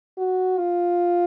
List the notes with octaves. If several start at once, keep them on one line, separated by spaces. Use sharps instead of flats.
F#4
F4